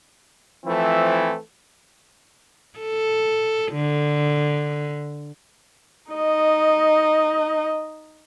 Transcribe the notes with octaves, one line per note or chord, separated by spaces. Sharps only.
E3 F3 A3 C4 E4
A4
D3
D#4 D#5